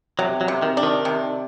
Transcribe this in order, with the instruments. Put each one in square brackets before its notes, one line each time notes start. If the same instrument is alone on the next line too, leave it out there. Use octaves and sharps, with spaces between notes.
[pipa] C3 [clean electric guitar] F#3
[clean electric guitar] F#3
[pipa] C3
[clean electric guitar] D#3
[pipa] D4
[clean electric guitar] D#3
[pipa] C3